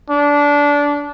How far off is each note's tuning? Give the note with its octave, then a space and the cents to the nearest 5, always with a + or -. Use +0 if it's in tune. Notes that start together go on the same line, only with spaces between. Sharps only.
D4 -20